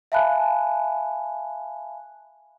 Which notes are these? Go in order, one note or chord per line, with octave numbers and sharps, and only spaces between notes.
E5 F5 G#5 A5 B5 F#6